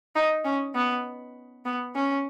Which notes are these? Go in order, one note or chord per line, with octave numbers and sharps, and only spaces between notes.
D#4
C#4
B3
B3
C#4